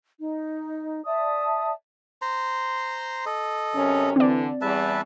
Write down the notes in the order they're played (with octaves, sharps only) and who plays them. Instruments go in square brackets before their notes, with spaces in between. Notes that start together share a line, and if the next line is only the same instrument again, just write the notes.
[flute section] D#4
D5 E5 A5 D#6
[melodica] C5 A#5 C6
A4 D#5
[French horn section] F#2 C3 C#4
[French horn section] D3 E3 [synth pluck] C4 D5
[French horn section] E2 G3 [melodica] B4 E5 A5